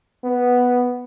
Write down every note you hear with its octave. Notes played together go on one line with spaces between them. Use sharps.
B3